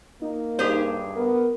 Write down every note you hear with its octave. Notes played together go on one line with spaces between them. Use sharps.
A#3 D#4
G2 G4 G#4 C5
B3 A#4